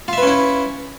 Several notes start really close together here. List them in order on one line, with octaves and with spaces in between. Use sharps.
F4 E5 B4 C#4 E4